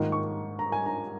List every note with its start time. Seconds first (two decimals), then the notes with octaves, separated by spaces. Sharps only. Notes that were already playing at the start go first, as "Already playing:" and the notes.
Already playing: G#2 D#3 A#3 F4
0.12 C#6
0.59 A#5
0.72 G#5
0.86 A#5